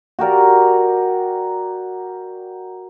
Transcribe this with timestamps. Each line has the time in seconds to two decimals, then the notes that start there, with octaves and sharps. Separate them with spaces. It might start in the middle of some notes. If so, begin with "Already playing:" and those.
0.19 F#4 G4 A#4 D5